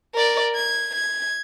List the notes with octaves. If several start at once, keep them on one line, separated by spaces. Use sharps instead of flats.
A#4 D5
G#6
G#6